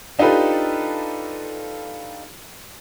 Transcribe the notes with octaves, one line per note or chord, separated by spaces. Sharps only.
D4 D#4 F4 G4 A4 B4